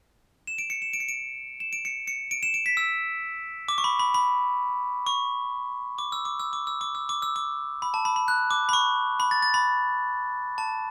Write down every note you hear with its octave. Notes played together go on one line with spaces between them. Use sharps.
E7
D7
C#7
E7
D7
C#7
D7
E7
D7
C#7
C#7
D7
E7
D7
B6
E6
D6
C#6
B5
B5
B5
C#6
D6
E6
D6
E6
D6
E6
D6
E6
D6
E6
D6
B5
A5
B5
B5
F#6
D6
B5
C#6
B5
A6
A6
B5
A5